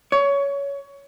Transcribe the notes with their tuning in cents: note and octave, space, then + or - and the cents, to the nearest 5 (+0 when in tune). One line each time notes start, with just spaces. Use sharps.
C#5 +20